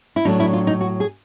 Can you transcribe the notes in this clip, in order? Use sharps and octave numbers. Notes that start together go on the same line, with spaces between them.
E4
A2 F#3 A3 D4 D#4
E4
F4
D#4
F#4
G#4